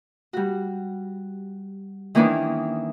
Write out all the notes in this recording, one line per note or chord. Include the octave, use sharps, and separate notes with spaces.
G3 F#4
D#3 E3 A#3 B3 C#4 D4